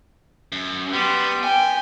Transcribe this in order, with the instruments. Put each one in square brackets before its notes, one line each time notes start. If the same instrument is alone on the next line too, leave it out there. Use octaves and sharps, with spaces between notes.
[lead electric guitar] F#2
[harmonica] G3 G4 C6 [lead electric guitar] B3
[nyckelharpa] G5 [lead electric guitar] G#5